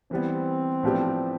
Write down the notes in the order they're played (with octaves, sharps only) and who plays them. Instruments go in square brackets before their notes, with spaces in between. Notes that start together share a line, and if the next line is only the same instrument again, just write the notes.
[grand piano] E3 G3 B3 [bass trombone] C4
[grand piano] A2 F3 B3 D4 G4